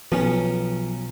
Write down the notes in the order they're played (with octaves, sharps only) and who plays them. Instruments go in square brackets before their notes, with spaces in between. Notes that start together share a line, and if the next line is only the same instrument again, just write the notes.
[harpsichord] B1 C#4 [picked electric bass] F3